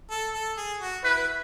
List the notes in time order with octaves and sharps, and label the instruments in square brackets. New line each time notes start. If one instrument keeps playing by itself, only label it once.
[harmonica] A4
A4
G#4
F#4
[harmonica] E4 [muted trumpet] B4